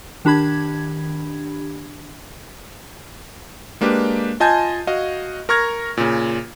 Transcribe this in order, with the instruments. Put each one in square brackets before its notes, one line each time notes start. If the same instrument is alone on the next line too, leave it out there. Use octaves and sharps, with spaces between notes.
[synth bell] D#3 D4 G4 B5 G#6
[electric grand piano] G#3 A#3 D4 G4 B4
F4 D#5 G#5 A5 G6 G#6
F#4 D#5 F5
A#4 A#5 C#6 F6 G#6 A#6
A#2 C#3